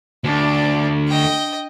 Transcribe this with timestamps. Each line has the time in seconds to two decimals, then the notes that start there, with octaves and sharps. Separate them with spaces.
0.24 D2 D4 D5
1.07 D#5 G5